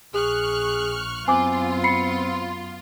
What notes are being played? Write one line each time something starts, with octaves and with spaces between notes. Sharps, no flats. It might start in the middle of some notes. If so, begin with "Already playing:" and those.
A#1 G#4 C#6 F6 F#6
F#2 B3 C4 F4 G#5 C6 D6
B5 C7 C#7